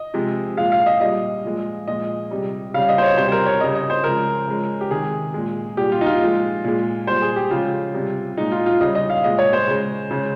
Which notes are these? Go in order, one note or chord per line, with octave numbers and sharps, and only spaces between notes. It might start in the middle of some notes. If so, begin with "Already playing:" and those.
Already playing: D#5
C3 F3 G#3
A#2 F3 G#3 F5
F5
D#5
A#2 G3 D#5
A#2 F3 G#3
A#2 F3 G#3 D#5
C3 G3
C#3 G3 F5
D#5
C5
C#5
C3 G3 C5
C5
A#4
C#5
C#3 G3 D#5
D#5
C5
C#3 F3 G#3 A#4
C#3 F3 G#3
G4
C3 D#3 G#3 G#4
A#2 G#3
A#2 G3 G4
F4
D#4
F4
A#2 F3 G#3
A#2 G#3
A#2 G3 C5
G#4
G4
C#3 F3 G#3 F4
C3 G3
A#2 G#3 D#4
F4
F4
C#3 G3 D#5
D#5
F5
A#2 G#3 D#5
C#5
C5
C#3 G#3
C#3 G#3